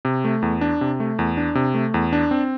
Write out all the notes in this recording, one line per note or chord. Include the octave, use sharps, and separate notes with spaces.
C3
A3
E2
D4
C3
A3
E2
D4
C3
A3
E2
D4
C4